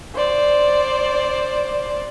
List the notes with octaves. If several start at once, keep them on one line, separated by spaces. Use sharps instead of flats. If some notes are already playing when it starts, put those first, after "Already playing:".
C5 D5